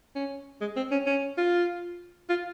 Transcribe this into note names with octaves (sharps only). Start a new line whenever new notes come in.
C#4
G#3
C4
C#4
C#4
F4
F4